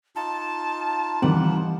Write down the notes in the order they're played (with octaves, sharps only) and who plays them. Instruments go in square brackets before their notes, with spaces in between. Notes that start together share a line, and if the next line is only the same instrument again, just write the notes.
[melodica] D#4 F4 [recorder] A5
[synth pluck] D#3 C4 [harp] E3 G3 F#5